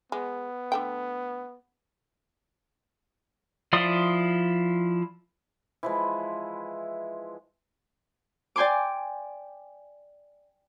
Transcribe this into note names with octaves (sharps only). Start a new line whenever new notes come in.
G#3 B3
D3 A3 G5
F3 E4 D5 C6 D#6
E3 F3 G#3
D5 G5 G#5 C6 D6